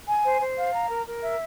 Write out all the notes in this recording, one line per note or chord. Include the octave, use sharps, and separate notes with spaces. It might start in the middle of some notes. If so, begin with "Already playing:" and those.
G#5
C5
C5
F5
A#5
A#4
A#4
E5